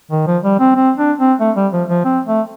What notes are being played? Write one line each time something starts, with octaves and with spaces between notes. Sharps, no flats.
D#3
F3
G3
C4
C4
D4
C4
A3
G3
F3
F3
C4
A3